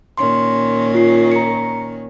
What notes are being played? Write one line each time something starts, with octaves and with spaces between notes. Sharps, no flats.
A#2 D#3 C#4 C6
F4 C7
A#5 C#7